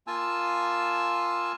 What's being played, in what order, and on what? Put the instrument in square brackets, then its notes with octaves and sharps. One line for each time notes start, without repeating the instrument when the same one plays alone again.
[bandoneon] A#3 F4 G#5 A5 E6